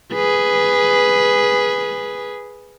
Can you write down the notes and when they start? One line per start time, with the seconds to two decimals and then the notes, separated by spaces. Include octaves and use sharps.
0.13 G#4 B4